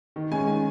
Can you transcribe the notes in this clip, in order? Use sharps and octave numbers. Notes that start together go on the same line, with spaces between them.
D#3
G#3 C#4 G#5
D#3